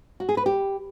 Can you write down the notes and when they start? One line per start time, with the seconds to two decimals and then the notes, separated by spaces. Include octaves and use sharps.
0.20 F#4
0.29 G#4
0.37 B4
0.46 G4